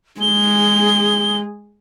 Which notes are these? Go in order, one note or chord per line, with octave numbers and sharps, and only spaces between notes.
G#3 G#4 G7